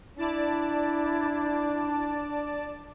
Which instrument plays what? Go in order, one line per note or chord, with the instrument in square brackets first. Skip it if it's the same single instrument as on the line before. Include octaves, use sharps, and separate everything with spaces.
[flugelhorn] D4 [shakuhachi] E4 [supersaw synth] D5 A5